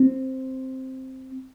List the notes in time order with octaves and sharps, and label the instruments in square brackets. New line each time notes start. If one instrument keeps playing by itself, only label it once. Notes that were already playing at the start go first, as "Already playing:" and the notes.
Already playing: [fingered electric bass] C4